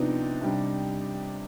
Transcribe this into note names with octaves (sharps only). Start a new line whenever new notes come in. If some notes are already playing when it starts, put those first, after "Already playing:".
Already playing: C3 F3 B3 D4 D#4
C3 G3 D4